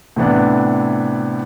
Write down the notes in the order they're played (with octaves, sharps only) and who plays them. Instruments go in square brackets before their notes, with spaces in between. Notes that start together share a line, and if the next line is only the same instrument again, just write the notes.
[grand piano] A2 C3 E3 B3 D4